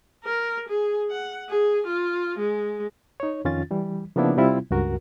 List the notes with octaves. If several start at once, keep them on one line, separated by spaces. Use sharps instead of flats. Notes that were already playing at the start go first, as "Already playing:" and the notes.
A#4
G#4
F#5
G#4
F4
G#3
D#4 C#5
F2 D#3 C#4 F4 A6
E3 G3
C#3 F3 A#3 B3 D4 E4
C3 G3 C4 E4 F4
C#2 G2 F#4 A#4